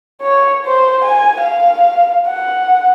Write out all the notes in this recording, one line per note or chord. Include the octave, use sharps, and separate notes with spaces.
C#5
C5
G#5
F5
F#5